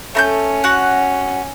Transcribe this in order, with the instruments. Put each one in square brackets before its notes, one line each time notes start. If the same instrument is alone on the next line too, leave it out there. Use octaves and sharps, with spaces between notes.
[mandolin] A3 A#5 G6 [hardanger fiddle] C#4
[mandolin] F#4 F#5